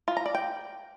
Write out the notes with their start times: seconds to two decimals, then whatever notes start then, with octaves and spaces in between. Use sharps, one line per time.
0.08 F4
0.17 A#5
0.26 D5
0.35 G5